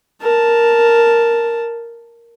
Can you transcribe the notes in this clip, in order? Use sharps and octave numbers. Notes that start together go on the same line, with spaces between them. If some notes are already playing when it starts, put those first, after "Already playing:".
A#4 A5